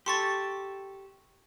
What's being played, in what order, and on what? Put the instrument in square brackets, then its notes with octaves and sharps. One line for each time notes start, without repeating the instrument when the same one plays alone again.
[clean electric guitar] G4 A4 [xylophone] C6 C#6 A6